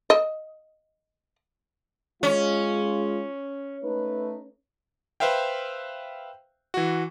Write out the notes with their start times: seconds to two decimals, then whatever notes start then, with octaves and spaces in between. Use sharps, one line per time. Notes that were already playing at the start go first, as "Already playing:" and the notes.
0.10 D#5
2.23 G#3 C#4 F4
3.84 A3 D#4 B4
5.20 B4 C5 E5 F5 G5
6.74 E3 F#4